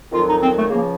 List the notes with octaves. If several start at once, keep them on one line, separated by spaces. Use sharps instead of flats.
F2 D#3 F#3 F4
D#4
C4
A3
C#2 C#3 F3 A#3